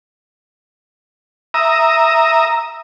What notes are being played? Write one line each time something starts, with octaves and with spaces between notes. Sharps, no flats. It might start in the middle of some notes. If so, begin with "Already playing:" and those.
E5 A#5 D#6